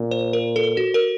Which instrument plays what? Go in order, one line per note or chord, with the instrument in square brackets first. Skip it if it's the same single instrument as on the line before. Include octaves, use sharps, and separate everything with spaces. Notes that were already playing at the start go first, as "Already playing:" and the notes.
Already playing: [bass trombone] A#2
[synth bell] C5
A#4
A4
F#4
A#4